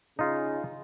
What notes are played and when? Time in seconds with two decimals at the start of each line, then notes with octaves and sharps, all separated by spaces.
0.19 C#3 D#4 F4